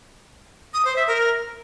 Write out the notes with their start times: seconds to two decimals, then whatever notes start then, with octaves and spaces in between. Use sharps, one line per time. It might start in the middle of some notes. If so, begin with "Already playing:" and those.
0.74 D#6
0.85 C5
0.96 E5
1.07 A#4